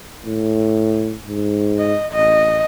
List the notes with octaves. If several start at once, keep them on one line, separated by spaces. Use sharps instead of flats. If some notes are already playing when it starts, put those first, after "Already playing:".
A2
G#2
D#5
A1 D#5